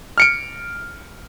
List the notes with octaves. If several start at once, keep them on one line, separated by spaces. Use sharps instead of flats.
F6 C#7 D7